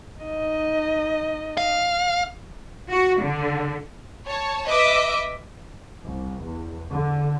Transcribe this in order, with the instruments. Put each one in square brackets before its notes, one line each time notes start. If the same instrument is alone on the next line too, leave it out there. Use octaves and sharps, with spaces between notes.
[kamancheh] D#4 D#5
[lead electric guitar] F5
[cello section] F#4
D3
[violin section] C#5 A5
B4 D#5 E5 D6
[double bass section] C2
E2
D3